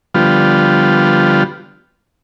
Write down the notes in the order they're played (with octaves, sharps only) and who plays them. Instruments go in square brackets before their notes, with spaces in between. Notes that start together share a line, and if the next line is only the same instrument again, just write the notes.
[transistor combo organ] D3 F3 G3 B3 F4